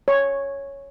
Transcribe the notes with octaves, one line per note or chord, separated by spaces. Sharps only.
C#5